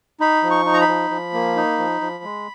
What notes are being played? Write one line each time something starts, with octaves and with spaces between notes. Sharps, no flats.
D#4 B5
F3
C#6
D#4
A#5
B5
F3
F3
A#3
D#4
F3
F3
G#3